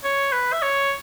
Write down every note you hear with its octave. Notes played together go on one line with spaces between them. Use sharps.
C#5
B4
E5
C#5